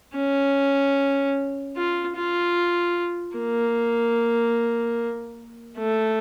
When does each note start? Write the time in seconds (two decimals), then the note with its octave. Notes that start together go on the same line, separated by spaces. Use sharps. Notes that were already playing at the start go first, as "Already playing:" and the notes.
0.15 C#4
1.76 F4
2.16 F4
3.37 A#3
5.78 A3